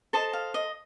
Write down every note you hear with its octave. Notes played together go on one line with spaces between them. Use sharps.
A4 C5 D#5 A5
F5
D#5